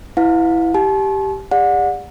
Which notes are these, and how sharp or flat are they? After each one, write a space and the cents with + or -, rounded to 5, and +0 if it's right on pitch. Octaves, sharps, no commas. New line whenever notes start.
E4 +0 B4 +35 F5 +45
G4 +0 A5 -40
G4 +45 D5 +0 F#5 -30